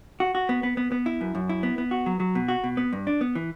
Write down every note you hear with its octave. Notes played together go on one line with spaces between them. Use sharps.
F#4
F#4
B3
B3
B3
B3
E4
F#2
F#2
E4
B3
B3
F#4
F#3
F#3
B2
F#4
B2
B3
G2
D4
B3
E3